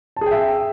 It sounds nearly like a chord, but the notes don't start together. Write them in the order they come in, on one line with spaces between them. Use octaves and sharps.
A5 G#4 G5 E5